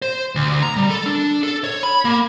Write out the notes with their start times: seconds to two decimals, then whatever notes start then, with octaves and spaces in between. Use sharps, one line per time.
0.02 C5
0.35 D2
0.62 A#5
0.76 G3
0.90 A4
1.06 D4
1.43 A4
1.64 C#5
1.83 B5
2.05 A#3